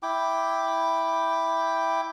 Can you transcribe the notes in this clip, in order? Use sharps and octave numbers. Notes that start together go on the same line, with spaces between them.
E4 G5 D6